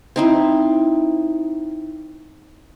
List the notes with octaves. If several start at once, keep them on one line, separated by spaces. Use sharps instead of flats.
C4 D#4 E4